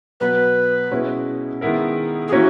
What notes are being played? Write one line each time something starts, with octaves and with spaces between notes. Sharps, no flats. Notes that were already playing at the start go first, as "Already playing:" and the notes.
B2 F#3 B3 B4
B2 G#3 C#4 E4
D#3 G#3 B3 E4 A#4
G#4
E3 A#3 C#4 E4 F#4